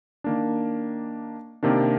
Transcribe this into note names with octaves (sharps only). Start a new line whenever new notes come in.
D#3 A#3 D4
C3 D#3 A#3 D4